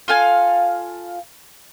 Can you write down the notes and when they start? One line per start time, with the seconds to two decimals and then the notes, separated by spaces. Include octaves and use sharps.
0.08 F4 A4 F5 G#5